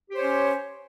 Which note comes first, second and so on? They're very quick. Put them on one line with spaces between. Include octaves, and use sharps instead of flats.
G4 C5 C#5 C#4